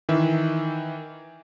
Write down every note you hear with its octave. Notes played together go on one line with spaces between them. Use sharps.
D#3 E3 E5